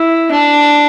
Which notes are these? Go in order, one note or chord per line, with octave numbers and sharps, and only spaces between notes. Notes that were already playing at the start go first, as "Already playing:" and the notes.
Already playing: E4
D4